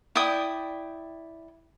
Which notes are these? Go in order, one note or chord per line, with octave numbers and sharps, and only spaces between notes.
E4 D5 G5 D#6